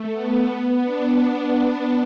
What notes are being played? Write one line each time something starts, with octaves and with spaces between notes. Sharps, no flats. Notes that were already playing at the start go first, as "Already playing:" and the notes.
Already playing: A3
B3
B3
D4